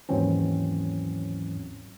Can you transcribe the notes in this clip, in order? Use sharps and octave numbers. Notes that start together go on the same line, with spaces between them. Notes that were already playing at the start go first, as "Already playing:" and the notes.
D#2 G#2 E3 F#3 C4 C#4